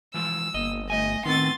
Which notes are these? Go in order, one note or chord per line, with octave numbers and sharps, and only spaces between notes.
E3 F3 G#3 E6
G1 A#3 D#5
A3 D#5 G#5
A2 D#3 B3 C4 C6 A6